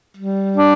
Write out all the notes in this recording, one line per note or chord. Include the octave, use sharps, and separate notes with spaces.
G3
D4